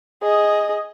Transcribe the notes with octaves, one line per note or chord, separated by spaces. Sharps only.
G#4 D#5